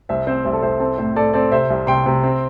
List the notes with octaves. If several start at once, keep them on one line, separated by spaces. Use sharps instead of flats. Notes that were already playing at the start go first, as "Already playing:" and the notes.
C2 C5 E5
C4 C5
C2 C5
A4
C2 C5
C4 A4
A2 C5
A2 A4 D5
C4 A4 D5
C3 C5 E5
C2
C3 G5 C6
C3
C4